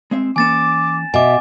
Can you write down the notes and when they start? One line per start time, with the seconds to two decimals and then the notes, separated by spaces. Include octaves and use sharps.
0.11 G#3 C4 E5
0.36 E3 A#3 C#4 G#5 D6 A6 E7
1.14 B2 E5 G#5 D6